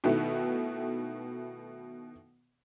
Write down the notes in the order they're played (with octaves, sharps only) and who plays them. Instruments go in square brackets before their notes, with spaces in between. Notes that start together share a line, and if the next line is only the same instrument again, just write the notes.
[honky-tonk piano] B2 D#3 A3 B3 E4